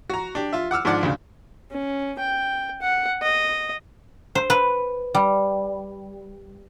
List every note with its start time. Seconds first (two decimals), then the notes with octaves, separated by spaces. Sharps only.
0.10 F#4 A#5
0.35 D4 G4
0.53 F4 E5
0.71 F#5 D6 E6 F6
0.85 G#2 F3 D4 D5 F#5
1.03 D2 C#3
1.71 C#4
2.19 G5
2.82 F#5
3.23 D#5
4.35 C5
4.50 B4
5.15 G3